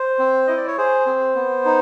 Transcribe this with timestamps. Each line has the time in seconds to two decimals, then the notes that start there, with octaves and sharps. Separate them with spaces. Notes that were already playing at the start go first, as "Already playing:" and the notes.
Already playing: C5
0.19 C4
0.47 E4 D#5
0.57 D5
0.67 C#5
0.78 G#4 C5
1.06 C4
1.35 B3
1.65 D#4